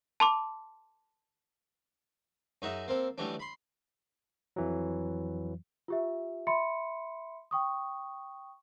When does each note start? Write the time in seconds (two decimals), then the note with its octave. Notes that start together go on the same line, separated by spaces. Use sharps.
0.20 A5 C6 D6
2.62 F#2 D#4 F#4 G#4 E5
2.88 A#3 C4 A4
3.18 E3 F#3 G3 A3 C#4 D4
3.39 B5 C6
4.56 F2 E3 F#3
5.88 F4 G4 E5
6.47 E5 B5 C6 C#7
7.51 G5 C#6 D#6